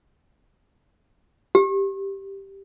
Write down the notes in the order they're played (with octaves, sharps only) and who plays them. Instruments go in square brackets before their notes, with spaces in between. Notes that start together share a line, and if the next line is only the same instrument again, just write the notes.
[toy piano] G4